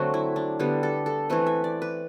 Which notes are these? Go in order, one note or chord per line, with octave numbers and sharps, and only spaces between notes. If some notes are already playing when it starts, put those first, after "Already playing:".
Already playing: D3 F#3 A3 C4 F#4
E4
D4
D3 G3 B3 G4
A4
A4
E3 A3 C4 B4
E5
D5
B4